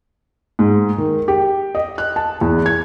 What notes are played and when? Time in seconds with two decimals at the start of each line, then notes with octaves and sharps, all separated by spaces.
0.59 G#2
0.98 D#3
1.28 G4
1.75 D#5
1.98 F#6
2.16 A5
2.41 E2
2.66 G#6